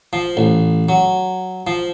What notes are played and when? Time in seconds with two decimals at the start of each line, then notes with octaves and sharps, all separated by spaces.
0.13 F3
0.37 A1
0.89 F#3
1.67 F3